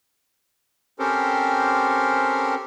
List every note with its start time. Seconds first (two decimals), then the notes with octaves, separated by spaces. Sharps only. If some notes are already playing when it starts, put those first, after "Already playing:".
0.99 C4 C#4 G4 A4 A#4 C5